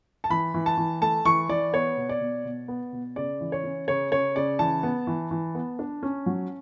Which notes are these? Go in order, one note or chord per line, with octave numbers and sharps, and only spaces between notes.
A5
E3 B5
E3
A5
E3
A3 A5
E3 C#6
E3 D5
B3 C#5
B2
D5
B2
B2
B3
B2
C#3 D5
E3
C#5
C#4
C#3 C#5
C#3 C#5
C#3 D5
E3 A5
B3
E3
E3
B3
D4
C#4
F#3